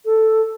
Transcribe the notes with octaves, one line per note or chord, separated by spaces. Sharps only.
A4